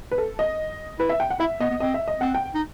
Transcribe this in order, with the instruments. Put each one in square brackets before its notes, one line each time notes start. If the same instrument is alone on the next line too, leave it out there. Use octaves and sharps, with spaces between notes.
[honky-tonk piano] B4
A4
D#5
[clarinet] E4 [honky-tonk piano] B4
[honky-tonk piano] E5
G5
F#5
[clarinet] E4 [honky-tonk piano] E5
[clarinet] B3 [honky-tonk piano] D#5
[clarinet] B3
[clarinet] C4 [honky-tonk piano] D#5
[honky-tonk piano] E5
D#5
[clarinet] C4 [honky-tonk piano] F#5
[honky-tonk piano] G5
[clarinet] D#4